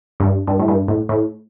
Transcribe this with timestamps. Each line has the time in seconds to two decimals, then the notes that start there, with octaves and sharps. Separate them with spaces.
0.20 G2
0.47 G2
0.59 A2
0.68 G2
0.88 A2
1.09 A2